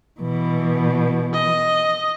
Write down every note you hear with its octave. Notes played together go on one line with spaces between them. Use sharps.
B2 E3
D#5